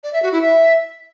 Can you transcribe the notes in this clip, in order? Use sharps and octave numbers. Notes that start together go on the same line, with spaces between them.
D5
E5
F#4
E4
E5